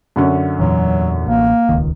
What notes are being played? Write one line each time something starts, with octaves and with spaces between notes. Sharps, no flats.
F#2 D3 C#4
E2 A#2 E3 F#3
A1 A#3
D#1 C#2 D#3